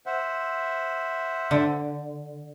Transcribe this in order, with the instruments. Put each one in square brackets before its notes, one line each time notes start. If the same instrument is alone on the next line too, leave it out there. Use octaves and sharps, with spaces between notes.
[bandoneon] C5 E5 F#5
[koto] D3